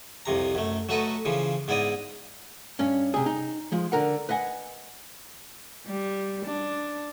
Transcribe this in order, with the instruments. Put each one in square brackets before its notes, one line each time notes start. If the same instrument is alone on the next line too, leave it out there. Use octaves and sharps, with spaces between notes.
[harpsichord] C2 F2 C3 A#5
F#2 A3
F#3 A3 F#4 A4 B4 D#5
C#3 E3 F3
G#2 B3 E4 D5 D#5 D#6
[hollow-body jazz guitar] G2 C#4
C3 G#4
D#4
F3 G#3
D3 A#4 F#5
B4 D#5 F#5 G#5
[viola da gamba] G3
D4